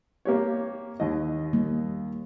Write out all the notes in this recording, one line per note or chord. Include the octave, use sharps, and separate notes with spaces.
A#3 G4 C#5
D#2 D#5
G3 A#3